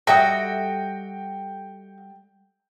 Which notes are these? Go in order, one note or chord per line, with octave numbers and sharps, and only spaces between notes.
G3 F#4 A4 D#5 E5 G5